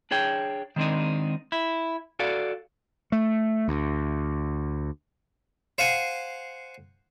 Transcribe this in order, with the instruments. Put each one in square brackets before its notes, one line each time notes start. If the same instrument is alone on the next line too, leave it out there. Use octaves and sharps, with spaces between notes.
[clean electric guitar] D4 G#4 C#5 G5
D#3 G#3 C4 D4 D#4
E4
F#4 A4 D5 F5
[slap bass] A3
D2
[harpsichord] C5 F5 F#5 G#5